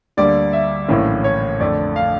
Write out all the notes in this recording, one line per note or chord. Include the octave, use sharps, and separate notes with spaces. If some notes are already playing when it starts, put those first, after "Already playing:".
D2 D3 G3 A#3 D5
E5
A#1 A2 E3 A#3 C#4
C#5
F2 D3 A3 D5
F5